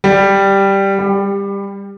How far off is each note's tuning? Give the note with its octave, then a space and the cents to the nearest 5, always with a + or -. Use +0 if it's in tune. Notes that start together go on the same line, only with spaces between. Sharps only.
G3 +0
G3 +20